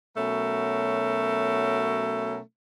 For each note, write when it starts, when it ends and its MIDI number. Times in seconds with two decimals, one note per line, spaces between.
0.16 2.38 47
0.16 2.38 54
0.16 2.38 57
0.16 2.38 61
0.16 2.38 70